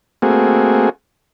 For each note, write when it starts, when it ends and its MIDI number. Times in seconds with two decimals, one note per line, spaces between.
0.22 0.89 57
0.22 0.89 58
0.22 0.89 60
0.22 0.89 66
0.22 0.89 68